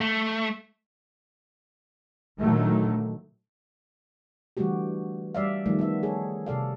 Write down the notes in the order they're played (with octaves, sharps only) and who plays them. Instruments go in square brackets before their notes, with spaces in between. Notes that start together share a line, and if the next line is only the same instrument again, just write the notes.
[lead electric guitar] A3
[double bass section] A#2 D3 D#3 F#3 A3
[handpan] D3 E3 G3 A3 F#4 G4
G3 D5 E5 F5
D#3 F3 G3 A3
B3 E5
G#4 A4 C#5
C3 A4 D5 F5